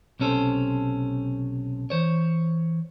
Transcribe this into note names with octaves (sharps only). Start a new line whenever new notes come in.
B1 C3 C#4 A4 C5
E3 C5 C#5